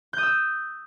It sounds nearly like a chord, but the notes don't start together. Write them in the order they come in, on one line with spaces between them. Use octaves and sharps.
G6 D#6 E6